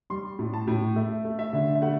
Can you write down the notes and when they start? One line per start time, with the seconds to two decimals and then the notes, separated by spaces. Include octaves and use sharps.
0.10 G3 C6
0.39 A2
0.53 A5
0.67 A2
0.96 A3 E5
1.25 A3
1.39 E5
1.53 D3
1.75 E5
1.82 A3 F#5